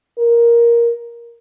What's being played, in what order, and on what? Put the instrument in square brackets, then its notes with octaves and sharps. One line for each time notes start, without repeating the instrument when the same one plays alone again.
[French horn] A#4